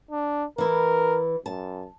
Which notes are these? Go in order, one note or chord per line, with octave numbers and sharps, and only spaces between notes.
D4
E3 E4 A#4
F#2 A5